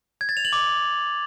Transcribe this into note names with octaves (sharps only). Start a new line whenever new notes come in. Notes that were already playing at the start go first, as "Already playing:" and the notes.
G#6
A6
F7
F#7
D6